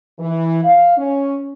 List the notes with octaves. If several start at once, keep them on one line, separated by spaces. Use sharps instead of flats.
E3
F5
C#4